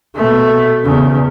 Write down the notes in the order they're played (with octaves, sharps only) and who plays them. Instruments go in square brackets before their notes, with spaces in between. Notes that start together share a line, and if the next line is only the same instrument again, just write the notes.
[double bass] B2 A3
E2 C#3